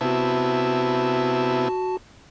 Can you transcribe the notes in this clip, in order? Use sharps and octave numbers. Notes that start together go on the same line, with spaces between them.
C3 B3 E4 F#4 A5